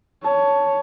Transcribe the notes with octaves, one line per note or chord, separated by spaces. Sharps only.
C#5 A5